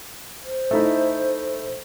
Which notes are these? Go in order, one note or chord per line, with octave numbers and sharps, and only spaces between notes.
C5
A3 D#4 E4